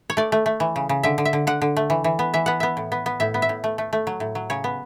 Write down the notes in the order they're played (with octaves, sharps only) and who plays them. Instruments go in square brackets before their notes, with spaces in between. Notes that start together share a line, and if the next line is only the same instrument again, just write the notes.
[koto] C#5
A3 D5
A3
A3
E3
C#3
C#3
D3 E5
D3
E5
D3
D3 F#5
D3
A3
E3
E3
B3
E3 E5
B3 F#5
B3 E5
A2
B3
B3
A2 E5
B3
E5
A2
A3
A3
A3
F#3
A2
F#3
C#3 C#5
B3